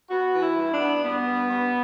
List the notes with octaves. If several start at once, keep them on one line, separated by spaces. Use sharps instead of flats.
B3 F#4
E3
E4
G2
D4
B3
G2 B3
G2
G2